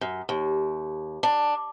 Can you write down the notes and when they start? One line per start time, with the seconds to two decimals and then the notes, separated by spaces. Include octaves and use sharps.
0.01 F#2
0.29 D#2
1.23 D4